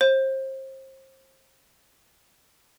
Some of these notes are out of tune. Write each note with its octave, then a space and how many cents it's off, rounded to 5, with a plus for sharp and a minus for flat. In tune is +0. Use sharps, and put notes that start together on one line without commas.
C5 +30